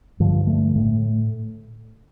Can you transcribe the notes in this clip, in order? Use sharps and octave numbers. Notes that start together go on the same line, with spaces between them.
G2 D3 F3
A3
A2 A3